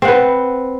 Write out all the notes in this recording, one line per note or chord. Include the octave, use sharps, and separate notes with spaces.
C4 B4 F#5